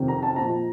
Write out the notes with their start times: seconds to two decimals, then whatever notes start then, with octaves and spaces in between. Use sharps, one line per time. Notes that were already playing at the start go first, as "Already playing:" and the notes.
Already playing: F2 C3 D#3
0.08 A#5
0.23 A5
0.36 A#2 F3 A#5